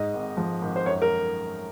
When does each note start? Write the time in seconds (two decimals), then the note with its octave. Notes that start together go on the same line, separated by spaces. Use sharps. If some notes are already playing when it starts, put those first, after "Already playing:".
Already playing: G#2 D#5
0.13 G#1
0.37 F3
0.61 G#1
0.76 C5
0.86 F#2 C#5
1.02 A#4